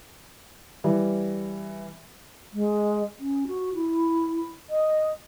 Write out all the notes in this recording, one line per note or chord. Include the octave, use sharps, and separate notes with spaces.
E3 G3
G#3
C#4
F#4
E4
D#5